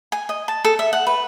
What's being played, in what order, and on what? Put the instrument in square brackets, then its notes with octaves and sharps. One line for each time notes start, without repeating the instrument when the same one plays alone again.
[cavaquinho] G#5
D#5
A5
A4
E5
F#5
B4